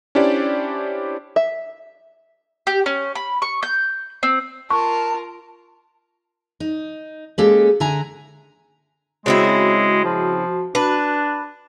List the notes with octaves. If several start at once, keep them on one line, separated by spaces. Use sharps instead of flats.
C#4 D4 E4 G4 C5 D5
E5
G4
C#4
B5
C#6
G6
C4
F4 A#4 A5 C#6
D#4
G#3 A#3 C#4 G4 A4
D3 E5 G#5 A#5
C#3 G#3 C4 E4 F#4
F3
D4 B4